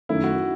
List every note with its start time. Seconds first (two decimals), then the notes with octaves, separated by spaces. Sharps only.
0.09 F#2 D#3 A3 C#4 E4
0.24 F#4